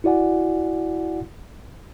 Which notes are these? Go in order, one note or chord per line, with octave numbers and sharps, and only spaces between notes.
E4 F#4 D5 F#5 G#5